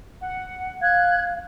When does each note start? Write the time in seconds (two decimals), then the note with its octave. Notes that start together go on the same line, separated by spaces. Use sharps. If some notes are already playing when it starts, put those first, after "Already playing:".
0.21 F#5
0.81 F5 F#6 G#6